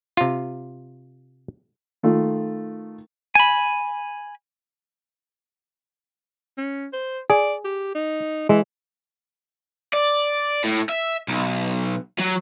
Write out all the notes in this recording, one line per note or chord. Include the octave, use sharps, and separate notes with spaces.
C3 F4
D#3 A3 F4
G#5 B5
C#4
C5
G#4 D5
G4
D#4
E3 G#3
D5
A2
E5
B1
F#3